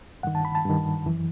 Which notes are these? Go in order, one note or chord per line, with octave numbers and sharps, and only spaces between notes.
G2 D#3 F#5
A5
B5
A5
G2 D#3
F#2 E3